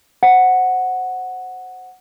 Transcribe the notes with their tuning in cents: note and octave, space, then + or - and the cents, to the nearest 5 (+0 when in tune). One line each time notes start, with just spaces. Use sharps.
C5 +0 F#5 +0